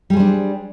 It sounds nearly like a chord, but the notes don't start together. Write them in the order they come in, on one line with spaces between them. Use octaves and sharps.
G3 G#4 C5 D4